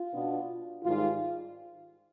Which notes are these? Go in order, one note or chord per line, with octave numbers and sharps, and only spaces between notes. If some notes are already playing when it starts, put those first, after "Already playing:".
Already playing: F4
B2 B3 D4
G#2 D#3 G3 F4